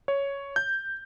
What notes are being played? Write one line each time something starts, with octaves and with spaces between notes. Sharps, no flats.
C#5
G6